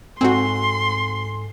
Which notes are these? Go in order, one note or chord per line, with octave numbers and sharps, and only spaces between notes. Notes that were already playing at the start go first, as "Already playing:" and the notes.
G#2 C4 F#4 A4 G#5 C6